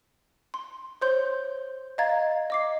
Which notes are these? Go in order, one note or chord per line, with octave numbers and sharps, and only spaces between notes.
C6
C5 C#5 C6 G6
D#5 F5 A#5 G#6 A6
D#5 D6 C7